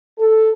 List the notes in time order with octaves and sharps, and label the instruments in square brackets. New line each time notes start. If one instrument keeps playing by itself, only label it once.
[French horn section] A4